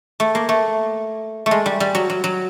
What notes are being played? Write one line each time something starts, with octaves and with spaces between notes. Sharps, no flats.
A3
A#3
A3
A3
G#3
G3
G3
F#3
F#3
F#3